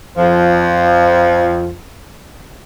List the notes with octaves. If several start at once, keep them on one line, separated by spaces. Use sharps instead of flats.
F2 F3